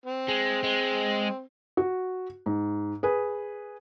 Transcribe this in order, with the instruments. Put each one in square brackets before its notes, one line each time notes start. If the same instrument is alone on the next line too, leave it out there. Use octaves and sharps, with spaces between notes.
[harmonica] C4
[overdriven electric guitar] G#3
G#3
[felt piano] F#4
G#2
G#4 B4